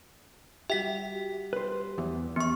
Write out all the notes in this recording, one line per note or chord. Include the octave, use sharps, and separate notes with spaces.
G3 F#4 G4 E5 B6
B4 C5
E2
E2 B3 C#6